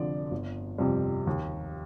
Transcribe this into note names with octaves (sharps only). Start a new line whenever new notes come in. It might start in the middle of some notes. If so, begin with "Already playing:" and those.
Already playing: F1 F2 D3 F3 D5
G1
F2 C3 G3
D#2